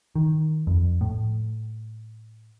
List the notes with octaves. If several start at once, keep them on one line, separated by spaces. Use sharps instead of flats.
D#3
F2
A2